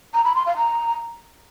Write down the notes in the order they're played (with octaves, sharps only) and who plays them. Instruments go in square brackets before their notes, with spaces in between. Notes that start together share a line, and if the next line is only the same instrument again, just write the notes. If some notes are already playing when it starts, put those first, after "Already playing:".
[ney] A#5
B5
C6
F5
A#5